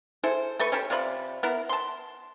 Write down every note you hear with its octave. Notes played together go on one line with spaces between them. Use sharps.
E4 G#4 A4 C5
A3 A4 B4 C#6
C#4 G4 A4
C3 F4 D5 B5
B3 E4 A#4
A5 C6